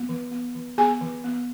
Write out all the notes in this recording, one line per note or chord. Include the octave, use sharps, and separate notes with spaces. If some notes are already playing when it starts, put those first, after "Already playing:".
Already playing: B3
E3
B3
E3
B3 G#4 G#5
E3
B3